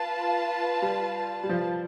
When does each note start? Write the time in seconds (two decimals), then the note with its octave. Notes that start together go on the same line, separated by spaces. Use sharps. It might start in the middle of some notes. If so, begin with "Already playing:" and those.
Already playing: F4 B4 F5 A5
0.82 G3
1.43 G3
1.49 F3